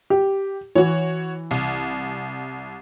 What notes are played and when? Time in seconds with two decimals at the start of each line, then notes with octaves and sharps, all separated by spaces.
0.10 G4
0.75 E3 F#4 C#5
1.51 C2